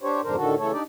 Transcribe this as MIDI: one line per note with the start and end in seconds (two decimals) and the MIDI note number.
0.02 0.21 62
0.02 0.21 67
0.02 0.21 72
0.02 0.21 73
0.23 0.36 41
0.23 0.36 44
0.23 0.36 50
0.23 0.36 62
0.23 0.36 70
0.23 0.36 72
0.36 0.55 45
0.36 0.55 50
0.36 0.55 51
0.36 0.55 66
0.36 0.55 69
0.58 0.72 49
0.58 0.72 52
0.58 0.72 57
0.58 0.72 69
0.58 0.72 73
0.72 0.83 62
0.72 0.83 63
0.72 0.83 67
0.72 0.83 74